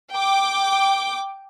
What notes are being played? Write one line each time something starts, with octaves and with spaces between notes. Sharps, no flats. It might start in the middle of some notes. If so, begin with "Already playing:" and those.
G5 D6